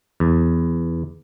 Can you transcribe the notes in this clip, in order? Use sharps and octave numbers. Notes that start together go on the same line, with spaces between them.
E2